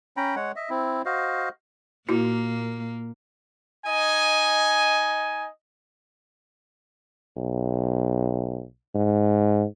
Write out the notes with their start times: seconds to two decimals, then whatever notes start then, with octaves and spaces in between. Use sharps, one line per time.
0.17 C#4 G5 A#5 B5
0.36 G#3 C#5 F#5
0.56 D#5 E5
0.70 C4 E4
1.06 F#4 C5 D#5 F5
2.09 A#2 A#3 E4 F#4
3.86 D#4 D#5 G#5
7.36 B1
8.95 G#2